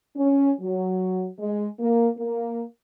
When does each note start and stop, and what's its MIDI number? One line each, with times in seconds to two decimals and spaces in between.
0.17 0.52 61
0.61 1.28 54
1.39 1.66 56
1.80 2.09 58
2.18 2.63 58